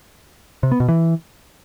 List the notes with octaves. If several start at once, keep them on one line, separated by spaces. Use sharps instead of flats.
C3
B3
B2
E3